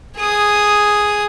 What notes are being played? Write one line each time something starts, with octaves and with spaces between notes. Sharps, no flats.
G#4 D#6